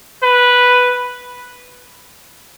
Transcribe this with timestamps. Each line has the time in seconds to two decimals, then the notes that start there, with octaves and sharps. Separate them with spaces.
0.23 B4